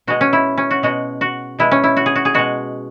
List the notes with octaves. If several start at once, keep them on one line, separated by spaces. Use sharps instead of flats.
B2 G#3 F#4
C#4
E4
C#4
F#4
B2 G#3 F#4
F#4
B2 G#3 E4
C#4
E4
F#4
G#4
F#4
G#4
B2 G#3 F#4